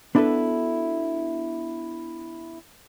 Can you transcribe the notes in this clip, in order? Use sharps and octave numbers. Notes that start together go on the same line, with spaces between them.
B3 D4 E4 F#4 A4 B4